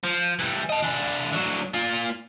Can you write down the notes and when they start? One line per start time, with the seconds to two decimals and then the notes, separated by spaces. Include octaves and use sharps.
0.04 F3
0.39 E3 G3
0.70 D#5 A5
0.83 E3 D4
1.32 D3 F#3
1.74 A#3 F4